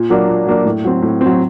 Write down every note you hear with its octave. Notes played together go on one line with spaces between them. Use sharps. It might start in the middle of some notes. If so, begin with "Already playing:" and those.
Already playing: A#2
F#3 A#3 D4
A#2
F#3 A#3 D4
A2
F#3 C4
A2
F#3 C4